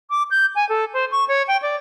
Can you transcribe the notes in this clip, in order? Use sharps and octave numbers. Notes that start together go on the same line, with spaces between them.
D6
G6
G#5
A4
C5
C#6
C#5
G5
D5